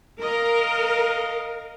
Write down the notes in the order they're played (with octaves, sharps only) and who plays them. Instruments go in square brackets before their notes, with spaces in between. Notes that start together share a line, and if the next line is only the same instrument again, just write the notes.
[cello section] A#4 [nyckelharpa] D#5 F5